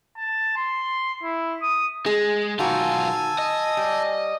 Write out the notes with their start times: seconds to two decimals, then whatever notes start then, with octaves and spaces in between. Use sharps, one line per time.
0.18 A5
0.56 C6
1.23 E4
1.62 D#6
2.06 G#3 G#4
2.59 B1 D#3 F4 F#4 G#5 A5 E6
3.39 D#5
3.77 G3